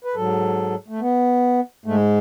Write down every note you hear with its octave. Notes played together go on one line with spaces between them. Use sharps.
B4
G#2 F#3 A4
A3
B3
G#2 G#3 A3